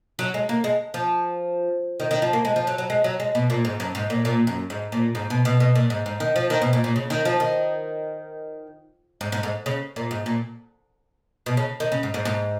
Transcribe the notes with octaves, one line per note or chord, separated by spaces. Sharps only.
F#3
G#3
A#3
G#3
F3
D#3
D#3
F3
A#3
G#3
F3
F#3
F#3
G#3
F#3
G#3
B2
A#2
G#2
F#2
G#2
A#2
A#2
F#2
G#2
A#2
G#2
B2
B2
B2
A#2
G#2
G#2
D#3
F3
D#3
B2
A#2
A#2
C#3
D#3
F3
D#3
G#2
G#2
G#2
C#3
A#2
G#2
A#2
B2
C#3
D#3
C#3
G#2
G#2
G#2